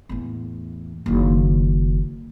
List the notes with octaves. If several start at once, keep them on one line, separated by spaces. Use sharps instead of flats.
E2 A2
F#1 D#3